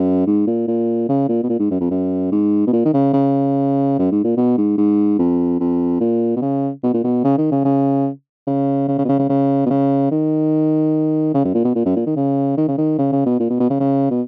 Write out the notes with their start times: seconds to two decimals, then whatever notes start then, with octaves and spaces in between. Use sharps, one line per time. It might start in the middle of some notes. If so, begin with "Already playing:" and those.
Already playing: F#2
0.27 G#2
0.47 A#2
0.68 A#2
1.09 C#3
1.29 A#2
1.43 B2
1.49 A#2
1.60 G#2
1.71 F#2
1.81 F2
1.91 F#2
2.32 G#2
2.67 B2
2.73 A#2
2.85 D#3
2.94 C#3
3.14 C#3
3.99 F#2
4.12 G#2
4.24 A#2
4.37 B2
4.57 G#2
4.78 G#2
5.19 F2
5.60 F2
6.01 A#2
6.36 B2
6.42 C#3
6.83 B2
6.94 A#2
7.04 B2
7.24 C#3
7.38 D#3
7.51 C#3
7.65 C#3
8.47 C#3
8.88 C#3
8.98 C#3
9.05 B2
9.09 C#3
9.19 C#3
9.29 C#3
9.66 B2
9.70 C#3
10.11 D#3
11.34 C#3
11.45 F#2
11.54 A#2
11.65 B2
11.75 A#2
11.86 F#2
11.96 A#2
12.06 D#3
12.16 C#3
12.57 D#3
12.68 C#3
12.78 D#3
12.99 C#3
13.12 C#3
13.26 B2
13.40 A#2
13.50 B2
13.60 B2
13.70 C#3
13.80 C#3
14.11 B2